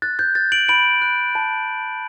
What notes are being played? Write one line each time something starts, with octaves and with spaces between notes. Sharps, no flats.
F#6 A6
G6
F#6 A6
D7 F#7
B5 D7 F#7
F#6
A5